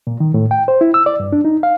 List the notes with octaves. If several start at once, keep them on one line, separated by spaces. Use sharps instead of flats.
A#2
D#3
A2
G5
C5
E4
E6
D5
G2
D4
D#4
F5